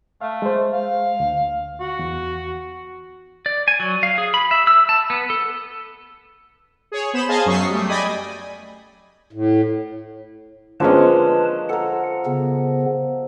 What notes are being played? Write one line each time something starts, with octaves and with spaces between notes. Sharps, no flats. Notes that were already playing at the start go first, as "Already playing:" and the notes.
A3 F5
G#3 C5
F5
D2
F#4
E2
D5
G#5
F#3
F5
G#4
B5
E5
E6
A5
B3
A4
G#4 C#5
B3 C5 B5 E7
G#4 C5 D#5 F5 G#5 A5
F#2 F#3 C#6 D#6 B6 C7
G3 A3
D5 D#5 G5 G#5 B5 D#6
A2
D3 F3 G#3 A#3 C#4 B4 D#5 A5
A4 A#4 F#5
C#3 B3